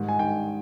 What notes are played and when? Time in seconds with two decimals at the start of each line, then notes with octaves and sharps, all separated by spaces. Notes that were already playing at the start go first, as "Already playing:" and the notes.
Already playing: G#2 D#3 G3
0.08 G#5
0.19 G#2 D#3 G3 G5